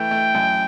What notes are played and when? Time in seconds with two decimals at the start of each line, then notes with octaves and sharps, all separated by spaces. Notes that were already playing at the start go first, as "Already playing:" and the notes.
Already playing: E3 A3 G5
0.11 A3
0.35 F#2